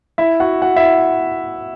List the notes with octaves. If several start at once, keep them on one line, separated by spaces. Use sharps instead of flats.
E4 E5
F#4 F#5
F#4 F#5
E4 E5